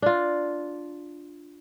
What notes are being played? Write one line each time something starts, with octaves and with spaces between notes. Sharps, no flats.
D4 F4